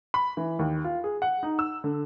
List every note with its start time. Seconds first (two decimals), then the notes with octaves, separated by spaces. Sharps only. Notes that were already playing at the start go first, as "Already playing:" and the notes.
0.14 B5
0.37 E3
0.59 D#2
0.84 F4
1.04 G#4
1.22 F#5
1.43 D#4
1.59 E6
1.84 D3